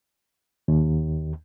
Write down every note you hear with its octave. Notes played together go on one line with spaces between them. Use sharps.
D#2